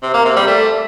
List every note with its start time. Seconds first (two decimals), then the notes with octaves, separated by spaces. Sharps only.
0.02 C3
0.14 A#3
0.25 C3
0.36 G3
0.47 A3